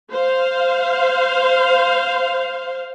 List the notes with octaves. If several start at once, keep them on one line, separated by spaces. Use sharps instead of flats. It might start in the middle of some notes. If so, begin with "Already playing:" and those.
C5 F5